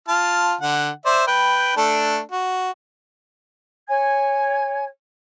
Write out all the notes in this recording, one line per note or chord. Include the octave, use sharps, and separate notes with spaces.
F4 A5 F6
D3 F#5
C5 D5 E5
B4 G5
A3 D4 A4
F#4
C#5 G#5 G#6